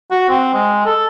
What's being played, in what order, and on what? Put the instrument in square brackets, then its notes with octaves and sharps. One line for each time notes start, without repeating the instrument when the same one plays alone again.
[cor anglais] F#4
C4
G#3
A4